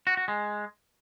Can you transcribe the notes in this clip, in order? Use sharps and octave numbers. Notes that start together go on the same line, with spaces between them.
F#4
F#4
G#3